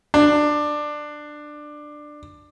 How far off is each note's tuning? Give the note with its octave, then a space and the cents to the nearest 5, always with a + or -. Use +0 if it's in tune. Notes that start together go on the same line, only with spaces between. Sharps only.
D4 +15